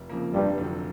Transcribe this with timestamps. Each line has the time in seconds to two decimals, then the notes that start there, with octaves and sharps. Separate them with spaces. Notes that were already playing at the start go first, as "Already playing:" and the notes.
Already playing: F1
0.10 F2 C#3 F3 A#3
0.33 F1 G2
0.58 F2 D3 F#3